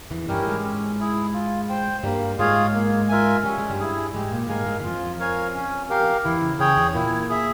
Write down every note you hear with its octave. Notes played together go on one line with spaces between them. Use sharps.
E2 E3
G2 G3 C#4 E4 G4 A#4
G#2 G#3
C#4
E4 G#4
F4
C5 G5
G2 G3 A#3
G#2 G#3 F4 G#4 C#5 F5
A#3
F4 A#4 E5 G#5
G3 C#4
G#3
G2 G3
E4 G#4
G#2 G#3 G4
A#2 A#3
G#2 G#3 A#4 F5 G#5
G#2 G#3
E3
F2 F3 F4
A#4 C#5 F5 G#5
C#4
G4 A#4 F5
E2 E3 E4
C#3
C#3 G#4 C#5 G5
E2 E3
A#2 A#3 E4
G#4 E5